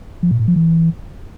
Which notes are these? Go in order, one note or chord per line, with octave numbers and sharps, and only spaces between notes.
F3
A#2
A2
F3
E3